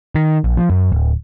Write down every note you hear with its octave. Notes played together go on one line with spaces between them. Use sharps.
D#3
A#1
F3
F#2
D1